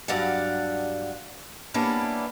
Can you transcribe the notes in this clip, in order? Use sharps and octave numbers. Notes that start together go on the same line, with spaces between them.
G2 F#3 D5 F5 F#5
G3 A#3 B3 C#4 D4 E4